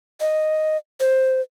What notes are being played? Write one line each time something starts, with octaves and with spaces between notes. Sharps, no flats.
D#5
C5